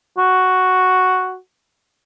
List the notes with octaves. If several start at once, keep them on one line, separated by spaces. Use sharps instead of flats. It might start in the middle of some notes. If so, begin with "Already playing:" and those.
F#4